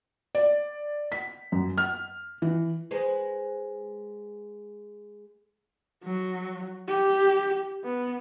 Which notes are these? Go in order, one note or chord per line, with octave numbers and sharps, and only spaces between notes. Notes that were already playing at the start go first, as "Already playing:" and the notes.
D5
B6
F#2
F6
E3
G#3 B4 C5
F#3
G4
B3